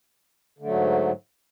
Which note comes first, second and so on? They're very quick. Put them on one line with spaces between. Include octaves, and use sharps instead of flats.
D3 A3 F#3 G#2